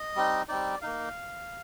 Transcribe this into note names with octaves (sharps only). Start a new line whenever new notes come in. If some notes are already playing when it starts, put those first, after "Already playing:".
Already playing: D#5
G3 C4 D#4
G3 C4 D#4 D5
A#3 D#4 F5